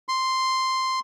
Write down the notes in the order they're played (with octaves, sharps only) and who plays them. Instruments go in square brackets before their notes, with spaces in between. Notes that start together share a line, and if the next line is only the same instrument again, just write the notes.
[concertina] C6